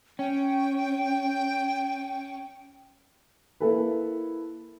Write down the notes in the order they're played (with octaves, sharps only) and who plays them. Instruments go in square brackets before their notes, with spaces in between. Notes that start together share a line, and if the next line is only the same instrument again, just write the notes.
[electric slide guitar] C#4 [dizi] G5
[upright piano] A#3 E4 A4 B4